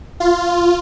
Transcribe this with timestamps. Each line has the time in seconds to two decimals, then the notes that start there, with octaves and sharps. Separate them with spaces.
0.20 F4